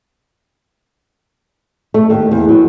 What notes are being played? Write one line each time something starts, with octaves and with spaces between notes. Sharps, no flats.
A3
D#2
E2
F#3